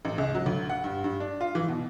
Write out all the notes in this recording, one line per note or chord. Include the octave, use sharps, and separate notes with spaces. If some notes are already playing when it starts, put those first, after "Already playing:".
A1
C#2
F#3
D2
F#5
G2
G2
D4
F4
E3
B2